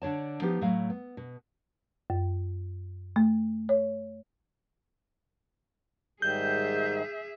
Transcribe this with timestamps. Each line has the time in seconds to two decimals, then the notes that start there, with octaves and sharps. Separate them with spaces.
0.02 D3 D4 C#5 A5
0.42 F3 B3 D#4 G4
0.61 A2 F#3 A3 F5
0.90 B3
1.17 B2
2.10 F#2
3.16 A3
3.69 C#5
6.22 G#2 D#3 G3 G#4 E5 G6